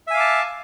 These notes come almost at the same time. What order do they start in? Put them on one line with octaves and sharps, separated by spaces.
E5 G#5 F5 D6 A5